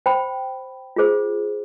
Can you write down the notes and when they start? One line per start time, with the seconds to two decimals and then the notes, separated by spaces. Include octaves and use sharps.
0.06 C5 G5 B5
0.96 F4 G#4 C5